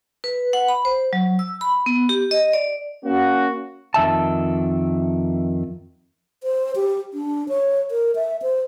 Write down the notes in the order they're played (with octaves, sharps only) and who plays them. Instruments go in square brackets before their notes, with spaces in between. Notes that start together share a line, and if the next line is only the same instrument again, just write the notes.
[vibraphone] B4
F#5
B5
C5
F#3
E6
B5
B3
G4
D#5
D5
[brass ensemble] A#3 C#4 F#4
[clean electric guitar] F2 D#3 E5 A5
[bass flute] C5
G4
D4
C#5
A#4
E5
C5